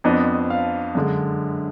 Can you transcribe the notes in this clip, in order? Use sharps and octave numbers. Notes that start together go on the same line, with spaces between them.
F2 F3 B3 D4 D#5
F5
F#2 D3 G#3